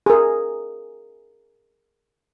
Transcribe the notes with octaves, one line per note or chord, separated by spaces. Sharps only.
G#4 A#4